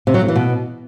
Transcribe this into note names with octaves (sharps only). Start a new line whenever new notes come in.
C3
F#3
A2
E3
B2